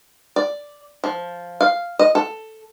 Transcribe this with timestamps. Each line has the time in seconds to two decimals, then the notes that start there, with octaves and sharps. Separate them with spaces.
0.36 D5
1.04 F3
1.61 F5
1.99 D#5
2.15 A4